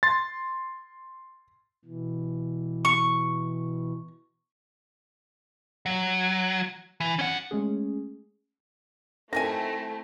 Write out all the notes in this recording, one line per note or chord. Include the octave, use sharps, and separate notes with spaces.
C6 A6
B2 E3
C#6
F#3
E3
C#4 F#5
G#3 A3 C#4 G#4
D#3 F#3 A3 C4 E4 G#5 A#6